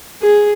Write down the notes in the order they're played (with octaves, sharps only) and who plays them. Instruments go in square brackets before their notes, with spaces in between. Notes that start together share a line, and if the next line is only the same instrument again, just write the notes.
[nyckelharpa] G#4